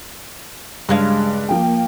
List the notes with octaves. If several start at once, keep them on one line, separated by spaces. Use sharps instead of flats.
G2 C#3 G#3 F5
F3 A#3 G5